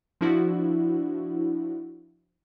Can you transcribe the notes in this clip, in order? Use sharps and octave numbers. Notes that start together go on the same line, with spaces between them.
F3 D4 E4 F#4